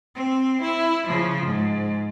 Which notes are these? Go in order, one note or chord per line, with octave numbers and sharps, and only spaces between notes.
C4
E4
C#3 F3
G#2